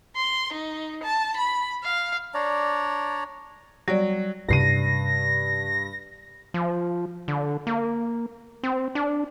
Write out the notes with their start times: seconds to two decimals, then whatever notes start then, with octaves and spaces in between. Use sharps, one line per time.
0.16 C6
0.52 D#4
1.03 A5
1.36 B5
1.84 F5
2.34 D4 C#5 D5 A#5
3.88 F#3 G3 D5
4.49 G2 C3 C#4 A#6 C7 D#7
6.54 F3
7.28 D3
7.67 A#3
8.63 C4
8.95 D4